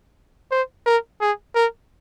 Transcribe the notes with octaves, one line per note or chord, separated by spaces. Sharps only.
C5
A#4
G#4
A#4